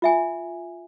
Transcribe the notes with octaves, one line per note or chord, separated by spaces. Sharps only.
F4 E5 G#5